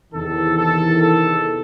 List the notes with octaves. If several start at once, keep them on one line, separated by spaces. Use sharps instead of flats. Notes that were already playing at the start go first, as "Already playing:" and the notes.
E2 C3 D#3 A4
A4
A4